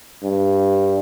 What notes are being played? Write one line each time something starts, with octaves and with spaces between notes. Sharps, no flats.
G2